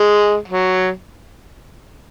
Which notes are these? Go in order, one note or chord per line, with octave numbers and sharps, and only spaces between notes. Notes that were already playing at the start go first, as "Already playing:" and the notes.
Already playing: G#3
F#3